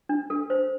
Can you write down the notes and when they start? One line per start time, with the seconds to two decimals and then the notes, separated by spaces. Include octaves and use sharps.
0.09 D4
0.30 A4
0.50 C5